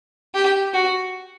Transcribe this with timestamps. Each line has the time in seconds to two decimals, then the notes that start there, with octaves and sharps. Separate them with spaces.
0.34 G4
0.74 F#4